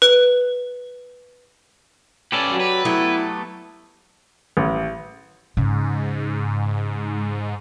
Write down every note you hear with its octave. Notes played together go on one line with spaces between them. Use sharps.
B4
C#4 G4 A4 B4 D5
F#3
B4
F#3 A3 B3 E4
A1
G#2 C#3